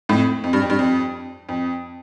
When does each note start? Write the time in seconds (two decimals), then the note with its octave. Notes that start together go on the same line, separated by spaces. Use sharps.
0.09 F2 A2
0.44 F2
0.53 G2
0.62 F2
0.70 G2
0.79 F2
1.49 F2